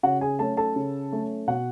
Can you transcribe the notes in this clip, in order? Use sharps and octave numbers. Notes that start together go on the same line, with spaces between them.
C#3 F#4 F#5
G#4 G#5
F#3 A3 C#4 A4 A5
A4 A5
C#3
F#3 A3 C#4
B2 F#4 F#5